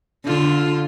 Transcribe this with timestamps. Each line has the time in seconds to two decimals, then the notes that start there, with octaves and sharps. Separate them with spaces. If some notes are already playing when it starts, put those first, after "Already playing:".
0.25 D3 F4